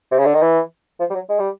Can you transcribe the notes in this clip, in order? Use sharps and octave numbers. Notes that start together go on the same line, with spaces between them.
C3
C#3
D3
D#3
E3
F3
G3
F#3
G#3
G3